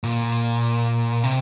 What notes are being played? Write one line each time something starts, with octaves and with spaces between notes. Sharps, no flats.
A#2
C3